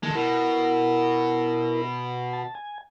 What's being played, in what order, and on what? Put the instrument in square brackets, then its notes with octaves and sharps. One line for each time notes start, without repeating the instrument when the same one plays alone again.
[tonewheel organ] D#3 E3 A#3 [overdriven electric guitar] G#3 A4
[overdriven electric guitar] B2 [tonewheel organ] E4 A#4
[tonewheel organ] A5
G#5